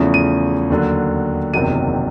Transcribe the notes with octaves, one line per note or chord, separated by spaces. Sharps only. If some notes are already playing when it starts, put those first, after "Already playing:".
Already playing: E2 C#3 F3 A3 C#4
D#7
D#2 D3 F#3
F#1 E2 C3 D#3 F#3 D#7